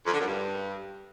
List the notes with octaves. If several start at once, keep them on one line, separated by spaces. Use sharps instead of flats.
F2
D3
F#2
G2